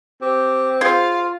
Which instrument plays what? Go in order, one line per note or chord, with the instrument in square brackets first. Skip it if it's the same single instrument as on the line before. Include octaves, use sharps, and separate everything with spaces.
[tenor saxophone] C4 [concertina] G4
[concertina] F4 [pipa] G#4 C5 C6 [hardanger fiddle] F5